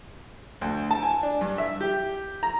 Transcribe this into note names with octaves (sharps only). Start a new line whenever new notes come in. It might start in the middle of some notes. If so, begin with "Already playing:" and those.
D2
A5
G#5
D4
G2
E5
G4
A#5